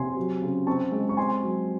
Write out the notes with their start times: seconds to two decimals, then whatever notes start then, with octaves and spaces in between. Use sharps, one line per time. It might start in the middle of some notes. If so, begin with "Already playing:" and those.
Already playing: C3 G#5 C6
0.17 F#3
0.42 C#3
0.67 C4 A5 C#6
0.92 G#3
1.09 C#6
1.17 C4 G#5 C6
1.43 F#3